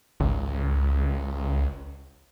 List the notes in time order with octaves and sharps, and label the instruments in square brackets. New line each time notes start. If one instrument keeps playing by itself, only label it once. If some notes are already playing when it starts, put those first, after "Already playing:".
[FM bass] G#1 [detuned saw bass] C#2